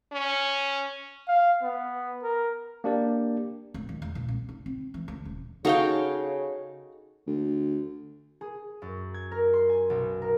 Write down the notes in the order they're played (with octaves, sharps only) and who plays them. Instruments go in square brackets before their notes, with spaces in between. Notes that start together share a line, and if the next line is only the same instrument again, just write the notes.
[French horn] C#4
[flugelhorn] F5
B3
A#4
[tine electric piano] A#3 D4 G4 D5
[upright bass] D1
D#3
E2
A#2
C2
D#4
C4
E3
D2
D#1
[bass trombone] C#3 [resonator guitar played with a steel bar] D#4 A4 C#5 [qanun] F#4 F5 G5
[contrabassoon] D2
[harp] G#4
F#2
G#6
A#4
C6
G#5
B1
A#4